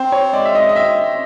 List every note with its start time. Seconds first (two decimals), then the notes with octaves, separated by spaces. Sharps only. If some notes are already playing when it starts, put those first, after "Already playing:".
Already playing: C4 C5
0.12 C#5
0.33 G#3 D5
0.45 E5
0.55 D#5
0.69 D#5
0.76 C4 E5